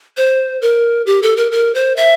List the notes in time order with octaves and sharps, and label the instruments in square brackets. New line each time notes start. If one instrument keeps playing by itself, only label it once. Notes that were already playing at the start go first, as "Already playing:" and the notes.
[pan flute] C5
A#4
G4
A4
A#4
A#4
C5
E5